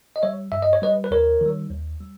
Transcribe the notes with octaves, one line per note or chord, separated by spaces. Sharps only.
D#5
G3 C#5 E5
G2 E5
D#5
C#5
G3 B4 D#5
B4
D#2 A#4 C#5
D#3 G3
D#2
G3